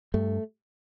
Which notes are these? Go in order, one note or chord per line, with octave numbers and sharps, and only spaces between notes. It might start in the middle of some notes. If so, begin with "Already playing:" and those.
G2 A3